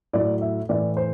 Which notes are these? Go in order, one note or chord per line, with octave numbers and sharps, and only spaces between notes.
A2 F#3 D5
E5
A2 E3 D5
C5